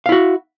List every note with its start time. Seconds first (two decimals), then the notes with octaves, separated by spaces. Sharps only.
0.06 F5
0.09 E4
0.12 F#4